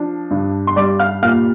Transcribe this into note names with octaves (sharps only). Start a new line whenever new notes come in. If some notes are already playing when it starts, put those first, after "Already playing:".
Already playing: F3 D4
G2
C6
G3 D5 D6
F5 F6
A#2 F5 F6